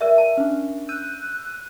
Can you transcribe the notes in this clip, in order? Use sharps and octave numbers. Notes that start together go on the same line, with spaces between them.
A#4 D5 E5
A5
C#4 D4
E6 F#6 G6 D#7